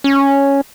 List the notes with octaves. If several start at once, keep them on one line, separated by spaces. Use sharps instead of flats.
C#4